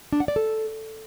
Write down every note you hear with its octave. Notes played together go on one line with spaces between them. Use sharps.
D4
F#5
D5
A4